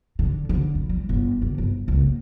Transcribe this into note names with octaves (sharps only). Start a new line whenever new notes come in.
D3
D3
F2
G3
G1
D3
G1
C#2
A#3